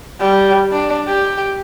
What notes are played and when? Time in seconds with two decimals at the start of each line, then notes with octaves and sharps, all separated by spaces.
0.20 G3
0.72 D4
1.07 G4